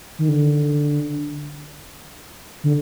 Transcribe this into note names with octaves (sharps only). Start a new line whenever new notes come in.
D#3
D3
D3